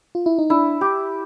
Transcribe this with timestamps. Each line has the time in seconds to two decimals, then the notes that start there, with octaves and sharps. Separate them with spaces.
0.15 F4
0.26 E4
0.38 D#4
0.50 D4 E4
0.81 G4